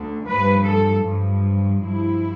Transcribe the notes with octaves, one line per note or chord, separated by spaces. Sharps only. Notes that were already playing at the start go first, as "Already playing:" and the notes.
Already playing: D2 D3
G2 F3 B4
A4
G2 F3
G2 F3 E4